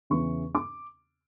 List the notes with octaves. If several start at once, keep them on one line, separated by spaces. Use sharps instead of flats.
E2 C#3 E3 C#6
D6